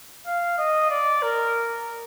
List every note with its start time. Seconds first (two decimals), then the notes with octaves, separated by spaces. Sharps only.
0.26 F5
0.58 D#5
0.90 D5
1.22 A#4